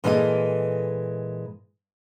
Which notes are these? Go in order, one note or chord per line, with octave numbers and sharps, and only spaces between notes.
A#2 E3 G#3 A4 C5 D#5